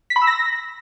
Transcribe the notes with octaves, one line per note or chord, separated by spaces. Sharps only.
B6
B5
E6
A#6